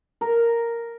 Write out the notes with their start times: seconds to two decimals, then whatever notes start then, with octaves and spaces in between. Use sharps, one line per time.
0.21 A#4